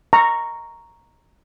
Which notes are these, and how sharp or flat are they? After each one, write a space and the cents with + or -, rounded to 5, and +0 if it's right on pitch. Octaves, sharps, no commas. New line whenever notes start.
A#5 +0 C#6 +0